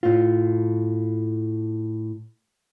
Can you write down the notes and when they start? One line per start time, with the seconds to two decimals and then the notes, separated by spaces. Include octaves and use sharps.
0.03 A2 F4